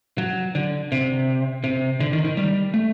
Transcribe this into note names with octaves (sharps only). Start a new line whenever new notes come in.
F#3
D3
C3
C3
D3
D#3
D#3
G3
A3